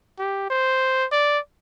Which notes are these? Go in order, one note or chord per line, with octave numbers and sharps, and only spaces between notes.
G4
C5
D5